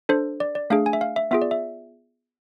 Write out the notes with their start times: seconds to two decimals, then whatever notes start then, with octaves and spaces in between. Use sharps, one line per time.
0.09 D4 A4 C5
0.40 D5
0.55 D5
0.70 A3 D4 G#4 F5
0.86 G#5
0.93 E5
1.01 F5
1.16 E5
1.31 B3 F4 G#4 E5
1.42 D5
1.51 E5